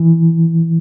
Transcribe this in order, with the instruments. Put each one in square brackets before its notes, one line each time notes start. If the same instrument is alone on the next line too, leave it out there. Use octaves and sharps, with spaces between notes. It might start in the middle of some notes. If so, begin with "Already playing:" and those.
Already playing: [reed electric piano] E3